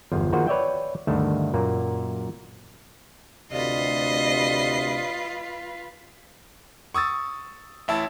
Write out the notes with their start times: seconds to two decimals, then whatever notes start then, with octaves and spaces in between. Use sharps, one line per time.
0.12 G1 E2 F3
0.33 D#3 F3 A#3 F#4 G#4 C5
0.47 B4 C#5 D5 E5 G5
1.07 D2 G2 D#3 A3 E5 A5
1.54 F#2 A#2 A#3
3.52 D2 C3 F4 B4 D5 D#5 C7
6.94 C#6 D#6 E6 A6
7.88 A1 E4 E5 A5